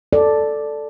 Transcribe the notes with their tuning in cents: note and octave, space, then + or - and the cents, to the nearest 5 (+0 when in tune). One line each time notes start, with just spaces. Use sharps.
A4 +0 D5 +0